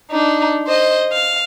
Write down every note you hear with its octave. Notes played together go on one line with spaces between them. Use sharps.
D4 D#4
C5 D#5
F5